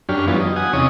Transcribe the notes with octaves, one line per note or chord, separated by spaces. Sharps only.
F#2 D4 G4 C#5 F6
E3 F#3 G3 B3 F4
D#5
F#5 G#5 D#6
E2 C3 C#4 C#5 D#5 D#6